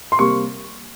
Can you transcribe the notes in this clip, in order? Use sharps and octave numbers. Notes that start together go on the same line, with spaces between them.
C6
C3 G3 A#3 C#6